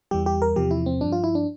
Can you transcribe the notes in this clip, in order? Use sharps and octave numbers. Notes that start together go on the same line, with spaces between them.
E2 E3 G3 G4
G4
A#4
E2 C3 F3 G4
E4
C4
G2 F3 D4
F4
E4
D4